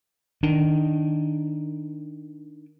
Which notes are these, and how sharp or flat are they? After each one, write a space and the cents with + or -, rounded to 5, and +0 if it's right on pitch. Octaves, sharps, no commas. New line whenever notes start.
D#3 +0 D4 +0